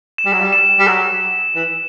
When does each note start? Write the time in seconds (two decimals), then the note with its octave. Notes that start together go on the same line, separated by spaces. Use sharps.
0.18 E7
0.25 G3
0.33 F#3
0.41 G3
0.53 E7
0.79 G3
0.87 F#3
1.55 E3